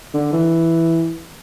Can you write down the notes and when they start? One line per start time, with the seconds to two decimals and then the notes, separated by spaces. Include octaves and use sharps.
0.14 D3
0.32 E3